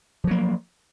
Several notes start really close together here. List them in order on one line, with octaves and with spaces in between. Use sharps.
F3 F#3 A#3